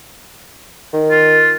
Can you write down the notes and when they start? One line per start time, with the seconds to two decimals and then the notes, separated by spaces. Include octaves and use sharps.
0.93 D#3
1.11 F4